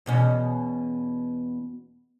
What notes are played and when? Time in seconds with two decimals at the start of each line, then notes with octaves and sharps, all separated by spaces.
0.06 E2 B2 C#4